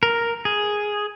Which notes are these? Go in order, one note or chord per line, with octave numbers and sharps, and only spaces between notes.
A#4
G#4